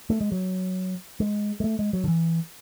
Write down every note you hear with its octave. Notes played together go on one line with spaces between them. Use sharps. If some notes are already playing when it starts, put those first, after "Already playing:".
A3
G#3
F#3
G#3
G#3
A3
G#3
F#3
D3
E3